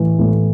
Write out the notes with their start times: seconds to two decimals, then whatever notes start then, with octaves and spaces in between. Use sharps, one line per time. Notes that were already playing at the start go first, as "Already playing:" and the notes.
Already playing: A2 E3
0.19 A2